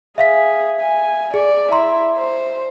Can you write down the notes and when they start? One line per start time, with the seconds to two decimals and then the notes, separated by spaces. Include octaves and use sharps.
0.18 G#4 E5 F5 B6
0.80 G#5
1.34 G#4 D5
1.72 E4 A#5 C6
2.18 C5